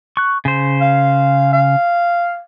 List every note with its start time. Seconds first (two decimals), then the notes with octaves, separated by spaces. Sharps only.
0.17 C#6 F#6
0.45 C#3 C5
0.81 F5
1.53 F5